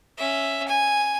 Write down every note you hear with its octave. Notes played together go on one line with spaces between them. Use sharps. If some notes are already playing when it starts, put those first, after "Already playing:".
C#4 E5
G#5